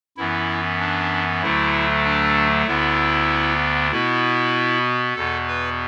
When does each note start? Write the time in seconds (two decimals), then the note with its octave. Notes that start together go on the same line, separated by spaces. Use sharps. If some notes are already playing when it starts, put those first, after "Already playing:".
0.17 F#2 E3 B3 E4
0.80 D4
1.42 D2 D3 F#3 A3 E4
2.04 D4
2.66 D2 D3 B3 E4
3.91 B2 B3 E4
5.15 E2 B2 B3 A4
5.47 B4